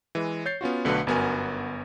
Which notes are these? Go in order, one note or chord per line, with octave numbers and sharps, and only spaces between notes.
E3 G#3
C#5 G6 A6 C7
B3 C#4 F4 F#4
B1 D3 A3 F#4 B4 F#6
G1 F#2 B3 F#4 A#4 G#5